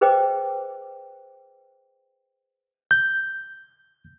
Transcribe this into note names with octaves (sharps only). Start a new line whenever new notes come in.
G#4 B4 C5 D#5 G5 D6
G6